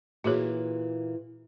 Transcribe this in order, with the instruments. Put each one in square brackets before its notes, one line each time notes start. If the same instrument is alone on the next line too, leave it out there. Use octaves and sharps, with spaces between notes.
[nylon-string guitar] A#2 E3 [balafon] F#4 G#4 C#5